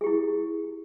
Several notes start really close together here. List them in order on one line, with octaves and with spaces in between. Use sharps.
G#4 G4 E4